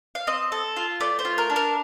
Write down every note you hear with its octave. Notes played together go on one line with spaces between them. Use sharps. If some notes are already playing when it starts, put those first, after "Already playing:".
F5
C4 D#5
A4
F4
A3 D5
C5
F4
A#4
D4
A#4